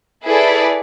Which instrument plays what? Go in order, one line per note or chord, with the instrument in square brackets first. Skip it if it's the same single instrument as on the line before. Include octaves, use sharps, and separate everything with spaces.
[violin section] E4 G#4 A4 B4 D5